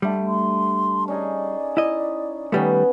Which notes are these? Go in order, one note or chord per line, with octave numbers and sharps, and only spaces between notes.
D3 G3 A3
C6
C#4 D#4 G#4 D5
E4 D#5
D#3 G3 A3 B3 C#4